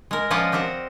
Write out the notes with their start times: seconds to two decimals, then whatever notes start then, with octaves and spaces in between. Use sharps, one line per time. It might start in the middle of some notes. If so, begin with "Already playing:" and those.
0.11 G#3 A#4
0.30 F3 C#4 F4 D5 D#5 F#5
0.52 C4 G4 A#4 C5 F#5